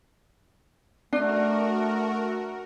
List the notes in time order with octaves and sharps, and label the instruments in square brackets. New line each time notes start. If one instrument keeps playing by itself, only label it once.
[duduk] A3 [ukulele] D4 [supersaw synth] F#4 A#4